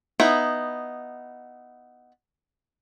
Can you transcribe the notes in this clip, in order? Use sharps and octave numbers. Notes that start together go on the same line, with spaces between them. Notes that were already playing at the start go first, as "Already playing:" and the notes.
B3 D#4 E4